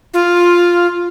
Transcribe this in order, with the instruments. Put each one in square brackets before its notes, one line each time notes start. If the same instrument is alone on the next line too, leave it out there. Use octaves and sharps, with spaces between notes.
[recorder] F4